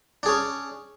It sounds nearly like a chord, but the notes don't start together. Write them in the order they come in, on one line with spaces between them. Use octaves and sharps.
D4 G#4 C#4